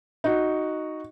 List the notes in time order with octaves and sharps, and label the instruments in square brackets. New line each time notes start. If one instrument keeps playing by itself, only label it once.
[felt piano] D#4 F#4